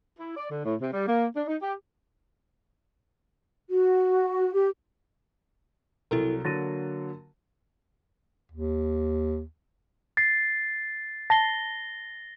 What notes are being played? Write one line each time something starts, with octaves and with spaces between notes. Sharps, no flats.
E4
D5
D3
A2
C3
G3
A#3
D4
D#4
G4
F#4
G4
C2 F#3 E4 A4 A#4
D3 F#3 A#3 A6 A#6 D#7
D#2
A6 C7
A5 A6 A#6 C7 G7